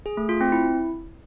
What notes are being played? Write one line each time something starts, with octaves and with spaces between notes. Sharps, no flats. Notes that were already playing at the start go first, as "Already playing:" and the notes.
G#4
A3
F4
C4
E4